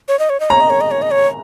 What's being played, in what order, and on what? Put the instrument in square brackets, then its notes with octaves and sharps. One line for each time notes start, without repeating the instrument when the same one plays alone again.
[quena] C#5
D#5
C#5
D#5
[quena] C#5 [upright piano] A#5
[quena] D#5
C#5
D#5
C#5
D#5
C#5